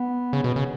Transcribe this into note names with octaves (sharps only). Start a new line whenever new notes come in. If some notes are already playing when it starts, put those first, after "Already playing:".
Already playing: B3
C#3
B2
C#3